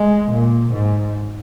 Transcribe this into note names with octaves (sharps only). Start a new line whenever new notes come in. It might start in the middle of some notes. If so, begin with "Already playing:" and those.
Already playing: G#3
A#2
G#2